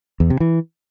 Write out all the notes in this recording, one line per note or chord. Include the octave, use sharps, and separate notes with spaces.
E2
C3
E3